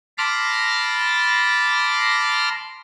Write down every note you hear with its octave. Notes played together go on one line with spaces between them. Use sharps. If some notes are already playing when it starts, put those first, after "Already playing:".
A5 B5 C6 D6 F6 A#6